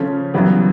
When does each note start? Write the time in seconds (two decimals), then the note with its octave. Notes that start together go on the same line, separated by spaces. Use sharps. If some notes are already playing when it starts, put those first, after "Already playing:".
Already playing: C#3 F3 A3 C#4
0.34 F#2 C#3 E3 G3 B3